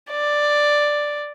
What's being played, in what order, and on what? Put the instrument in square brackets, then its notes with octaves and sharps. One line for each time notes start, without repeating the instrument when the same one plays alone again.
[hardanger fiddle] D5